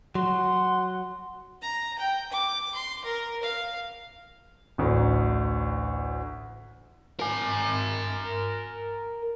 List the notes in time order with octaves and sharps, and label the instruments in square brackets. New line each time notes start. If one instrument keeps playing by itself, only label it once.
[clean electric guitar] F#3 [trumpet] F#5 [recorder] C6
[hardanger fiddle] A#5
G5
D6
C6
A#4
F5
[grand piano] A1 D2
[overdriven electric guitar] A#4 G#5